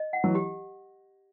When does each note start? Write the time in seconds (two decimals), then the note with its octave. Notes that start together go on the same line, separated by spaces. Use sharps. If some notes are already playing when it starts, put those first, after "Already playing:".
Already playing: D#5
0.13 F#5
0.24 E3 F#3
0.35 G4